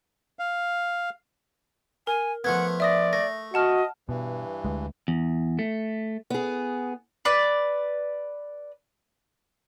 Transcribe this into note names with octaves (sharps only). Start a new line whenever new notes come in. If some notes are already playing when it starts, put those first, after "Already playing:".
F5
A#4 G#5
F3 A3 B3 F#5 G#6
D5 E5 D#6 A#6
A3 A#6
F#4 D#5 F#5 A5 F6
G2 B2 E3
D2 G#3
E2
A3
B3 G#4
B4 D5